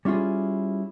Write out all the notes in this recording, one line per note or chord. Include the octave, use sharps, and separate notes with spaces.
G3 C#4 E4 F4 G#4